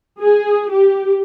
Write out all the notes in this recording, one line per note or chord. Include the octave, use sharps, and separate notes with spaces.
G#4
G4